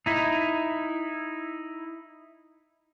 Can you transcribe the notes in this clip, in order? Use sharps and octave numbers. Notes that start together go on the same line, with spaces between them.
D#4 E4